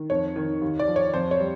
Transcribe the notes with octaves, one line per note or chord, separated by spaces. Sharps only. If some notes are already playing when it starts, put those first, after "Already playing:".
Already playing: D#3
F2 C#5
D#3
D#2
D5
F3
C#5
F2 C5
C#5
G3